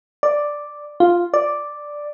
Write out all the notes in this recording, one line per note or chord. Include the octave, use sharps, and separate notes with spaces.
D5
F4
D5